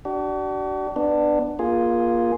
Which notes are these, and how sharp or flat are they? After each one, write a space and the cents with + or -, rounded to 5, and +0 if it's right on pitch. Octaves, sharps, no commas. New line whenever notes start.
D4 +0 F#4 +45
B3 +0 D4 +15
A#3 +25 F4 +0 G#4 +0